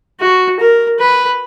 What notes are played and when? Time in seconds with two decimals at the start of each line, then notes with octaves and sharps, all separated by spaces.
0.20 F#4
0.59 A#4
0.99 B4